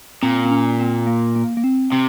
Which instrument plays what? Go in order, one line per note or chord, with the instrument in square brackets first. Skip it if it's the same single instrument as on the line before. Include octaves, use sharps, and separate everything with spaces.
[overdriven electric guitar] A#2 [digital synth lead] C4
[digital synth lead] C4
C#4
C4
A#3
A#3
A#3
C4
[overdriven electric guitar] C3 [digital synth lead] C4